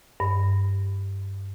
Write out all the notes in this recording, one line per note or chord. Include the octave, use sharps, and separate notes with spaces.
G2